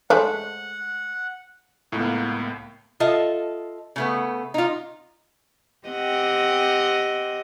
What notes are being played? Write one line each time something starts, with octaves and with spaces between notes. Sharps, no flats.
G#3 A3 C5 F#5
C#2 A2 A#3 B3
F4 A4 D#5 E5
C#3 A3 B3
D#4 F4
C4 G4 D#5 F#5